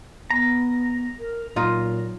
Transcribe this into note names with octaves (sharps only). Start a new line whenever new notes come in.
B3 A#5
A#4
A#2 F#3 D#4 F4